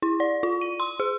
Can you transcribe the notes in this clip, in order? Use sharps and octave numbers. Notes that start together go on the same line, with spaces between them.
E4
D5
F4
D#7
C6
G#4